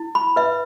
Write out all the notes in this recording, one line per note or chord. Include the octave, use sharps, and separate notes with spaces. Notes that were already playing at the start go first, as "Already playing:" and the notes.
Already playing: E4
B5
B4 E5